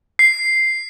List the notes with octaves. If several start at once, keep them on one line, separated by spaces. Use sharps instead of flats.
C7